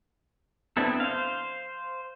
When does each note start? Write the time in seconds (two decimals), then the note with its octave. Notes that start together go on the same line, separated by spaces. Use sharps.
0.77 B3 C4 D4 E4 A4
1.00 C5 F5